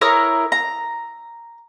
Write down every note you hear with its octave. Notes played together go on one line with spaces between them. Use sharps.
E4 A#4 C#5 D#6
A#5